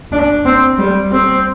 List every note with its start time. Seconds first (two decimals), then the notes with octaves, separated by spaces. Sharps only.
0.12 D4
0.45 C4
0.78 G3
1.11 C4